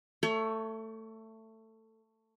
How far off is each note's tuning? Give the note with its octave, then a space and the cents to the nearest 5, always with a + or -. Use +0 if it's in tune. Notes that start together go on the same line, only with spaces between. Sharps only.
A3 +15 C#5 +35